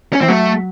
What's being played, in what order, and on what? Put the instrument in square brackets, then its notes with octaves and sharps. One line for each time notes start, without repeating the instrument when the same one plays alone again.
[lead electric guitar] C#4
[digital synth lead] E3 [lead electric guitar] C4
[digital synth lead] F#3 [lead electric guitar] A3